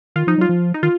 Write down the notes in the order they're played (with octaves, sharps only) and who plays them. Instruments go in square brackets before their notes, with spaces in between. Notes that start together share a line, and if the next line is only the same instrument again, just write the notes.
[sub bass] D#3 [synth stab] F4
[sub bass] F3 [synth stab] D#4
[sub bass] F#3
[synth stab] F4
[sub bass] F3
[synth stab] D#4
[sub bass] D#3 [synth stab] F4